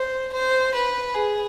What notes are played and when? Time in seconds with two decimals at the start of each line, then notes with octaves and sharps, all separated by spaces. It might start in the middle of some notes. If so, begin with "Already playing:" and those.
Already playing: C5
0.33 C5
0.74 B4
1.14 G#4